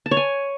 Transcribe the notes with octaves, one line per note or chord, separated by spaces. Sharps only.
A5
C#5
G#5